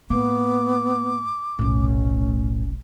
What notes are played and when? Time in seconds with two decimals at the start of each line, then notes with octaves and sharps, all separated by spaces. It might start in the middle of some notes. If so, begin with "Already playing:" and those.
0.10 A2 A#3 B3 D6
1.59 F1 B1 A2 C#4